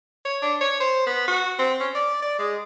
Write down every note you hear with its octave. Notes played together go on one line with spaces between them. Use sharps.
C#5
D4
C#5
C5
B3
F#4
C4
C#4
D5
D5
G#3